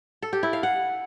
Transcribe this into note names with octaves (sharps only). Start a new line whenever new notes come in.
A4
G4
E4
F5
F#5